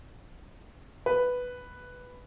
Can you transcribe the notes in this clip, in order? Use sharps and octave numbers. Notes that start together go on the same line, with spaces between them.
B4